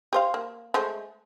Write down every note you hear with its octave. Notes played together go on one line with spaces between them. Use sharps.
G4 C5 F5
A#3
G#3 A3 C5